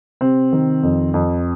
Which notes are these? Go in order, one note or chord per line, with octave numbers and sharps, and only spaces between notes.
C3 C4
D#3
F2
F2